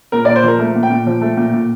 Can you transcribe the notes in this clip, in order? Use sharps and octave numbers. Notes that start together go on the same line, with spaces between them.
A#2 A#4
A#2 D5
C5
F3 A#4
A3
A#2
G5
A#2
F3
A3
A#2
A#2